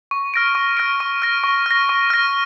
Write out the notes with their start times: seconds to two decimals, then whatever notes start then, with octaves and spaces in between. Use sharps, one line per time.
0.11 C#6
0.34 F6 A#6 D7
0.55 C#6
0.77 F6 A#6 D7
1.00 C#6
1.22 F6 A#6
1.44 C#6
1.66 F6 A#6
1.89 C#6
2.10 F6 A#6